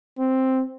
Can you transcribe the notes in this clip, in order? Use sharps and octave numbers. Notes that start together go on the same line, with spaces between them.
C4